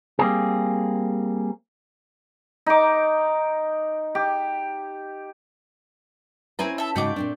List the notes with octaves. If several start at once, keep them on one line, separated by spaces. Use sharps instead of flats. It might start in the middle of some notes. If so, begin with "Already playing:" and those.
G3 A#3 C4 G#4
D#4 D6
G4
C4 C#4 E4 B4 G#5 A#5
A4 E5
G#2 C#3 A3 F#4 G5 D6
A#2 C4 D4